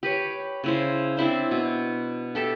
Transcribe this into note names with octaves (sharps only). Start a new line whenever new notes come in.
G4 B4 C#5
C#3 E4 C5
C4 D4 E4 C5
B2
G4 A4 E5